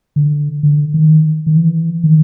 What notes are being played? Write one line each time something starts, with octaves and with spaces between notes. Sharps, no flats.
D3
D3
D#3
D#3
E3
D#3